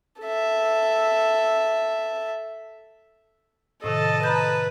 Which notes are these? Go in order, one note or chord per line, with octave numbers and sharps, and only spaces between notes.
A4 E5
A2 C3 D#3 A4 D#5 A5
B4 A#5 B5 G6